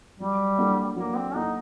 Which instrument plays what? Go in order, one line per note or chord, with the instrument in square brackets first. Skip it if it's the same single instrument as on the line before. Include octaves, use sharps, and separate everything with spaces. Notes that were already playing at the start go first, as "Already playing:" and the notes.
[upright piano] F#3 [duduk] G3
[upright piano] A#3 D4 F#4 A4
[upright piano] F#3 [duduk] A#3
[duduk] C4
[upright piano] A#3 D4 F#4 A4 [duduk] D#4